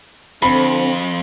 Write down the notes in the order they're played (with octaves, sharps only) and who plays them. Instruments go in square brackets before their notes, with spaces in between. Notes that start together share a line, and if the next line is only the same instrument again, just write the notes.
[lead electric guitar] F2 [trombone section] D3 C4 [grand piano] B5